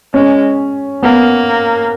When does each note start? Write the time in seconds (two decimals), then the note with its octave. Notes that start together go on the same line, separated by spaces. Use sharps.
0.14 G#3 C#4
1.03 A#3 B3